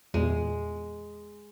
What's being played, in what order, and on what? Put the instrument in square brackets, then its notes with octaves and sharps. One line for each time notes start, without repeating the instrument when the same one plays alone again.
[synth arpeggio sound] E2 A#2 [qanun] G#3